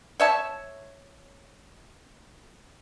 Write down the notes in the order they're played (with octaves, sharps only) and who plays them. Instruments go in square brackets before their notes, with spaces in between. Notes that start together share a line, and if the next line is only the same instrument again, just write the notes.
[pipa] C#5 E5 A5